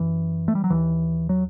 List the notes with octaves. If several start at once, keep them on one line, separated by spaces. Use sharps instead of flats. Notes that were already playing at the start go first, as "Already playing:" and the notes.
Already playing: F#2 E3
A3
G3
F#3
D#2 E3
F#3